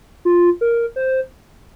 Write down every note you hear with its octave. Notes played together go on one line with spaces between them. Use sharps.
F4
A#4
C5